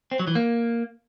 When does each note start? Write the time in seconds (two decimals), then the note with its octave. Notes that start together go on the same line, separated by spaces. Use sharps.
0.11 C4
0.19 F#3
0.27 E3
0.35 A#3